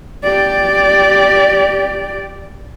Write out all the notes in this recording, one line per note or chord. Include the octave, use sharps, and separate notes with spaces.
G4 D5